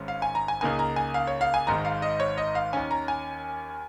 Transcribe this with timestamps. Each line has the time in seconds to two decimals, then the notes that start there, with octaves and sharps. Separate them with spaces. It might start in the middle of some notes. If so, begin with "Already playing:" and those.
Already playing: G#1 G#2 G#3 C#4
0.08 F5
0.22 G#5
0.35 A#5
0.48 G#5
0.61 C#2 C#3 A#3 D#4 G#5
0.79 A#5
0.96 G#5
1.14 F5
1.27 C#5
1.41 F5
1.54 G#5
1.67 G#1 G#2 D#3 G#3 A#5
1.85 F5
2.02 D#5
2.20 C#5
2.38 D#5
2.55 F5
2.73 D#2 D#3 C#4 G#5
2.91 A#5
3.08 G#5